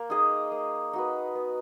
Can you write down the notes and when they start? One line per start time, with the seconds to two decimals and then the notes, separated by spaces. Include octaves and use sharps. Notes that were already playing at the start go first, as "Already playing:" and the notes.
Already playing: A#3
0.10 D#4 G#4 D#5
0.52 A#3
0.93 D#4 F#4 B4
1.35 B3